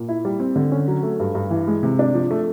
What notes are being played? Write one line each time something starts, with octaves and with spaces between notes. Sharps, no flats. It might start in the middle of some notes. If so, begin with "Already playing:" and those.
Already playing: A#2
E4
G3
C4
D3
C#4
F#3
A3
G2
G2
E3
G#3
C3
D4
F3
A3